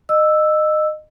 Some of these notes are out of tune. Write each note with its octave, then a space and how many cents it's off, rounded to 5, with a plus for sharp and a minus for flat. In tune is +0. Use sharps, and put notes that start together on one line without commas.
D#5 -20 E6 +0